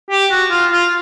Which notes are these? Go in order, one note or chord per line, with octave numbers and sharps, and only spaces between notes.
G4
F#4
F4
F4